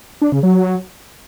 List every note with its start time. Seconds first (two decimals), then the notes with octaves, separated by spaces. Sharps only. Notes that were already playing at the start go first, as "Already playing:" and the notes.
0.22 D4
0.32 C#3
0.43 F#3